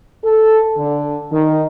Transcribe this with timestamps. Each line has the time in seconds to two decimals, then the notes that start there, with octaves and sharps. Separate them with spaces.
0.24 A4
0.77 D3
1.32 D#3